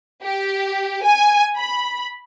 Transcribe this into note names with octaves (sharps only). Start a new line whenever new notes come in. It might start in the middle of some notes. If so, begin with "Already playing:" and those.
G4
G#5
B5